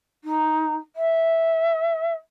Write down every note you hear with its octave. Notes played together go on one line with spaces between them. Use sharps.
D#4
E5